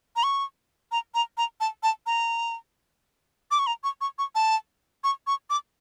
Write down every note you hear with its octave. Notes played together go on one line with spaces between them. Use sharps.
A#5
C#6
A#5
A#5
A#5
A5
A5
A#5
D6
C#6
A#5
C#6
C#6
C#6
A5
C#6
C#6
D6